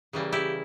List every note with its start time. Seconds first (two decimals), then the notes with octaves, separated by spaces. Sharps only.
0.13 C#3 E3 G3 A#3
0.32 E4 G4